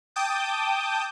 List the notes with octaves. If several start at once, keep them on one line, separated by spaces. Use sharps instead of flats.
G5 A5 D6 D#6 G6